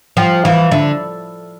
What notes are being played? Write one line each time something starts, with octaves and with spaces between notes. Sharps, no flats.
F3 G5
E3 F5
D3 E5